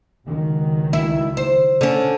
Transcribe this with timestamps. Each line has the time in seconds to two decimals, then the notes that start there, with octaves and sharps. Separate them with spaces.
0.27 C#2 D#3 F#3
0.93 E4
1.37 C5
1.81 D3 C#4